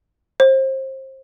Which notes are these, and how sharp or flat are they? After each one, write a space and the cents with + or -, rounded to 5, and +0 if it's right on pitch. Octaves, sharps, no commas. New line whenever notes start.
C5 +30